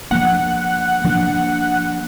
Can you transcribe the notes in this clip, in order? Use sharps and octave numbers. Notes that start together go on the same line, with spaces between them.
F3 A#3 D4 F#5
F3 A#3 D4